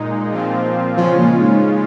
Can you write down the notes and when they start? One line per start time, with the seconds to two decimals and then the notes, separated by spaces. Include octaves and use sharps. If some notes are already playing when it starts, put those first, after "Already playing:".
Already playing: A#2 G#3 D#4
0.31 A#2 F3 C4 F4
0.97 C#3 F3 G#3 C#4 F4
1.18 A#2
1.40 G#2